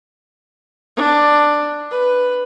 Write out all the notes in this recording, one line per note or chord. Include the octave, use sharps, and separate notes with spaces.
D4
B4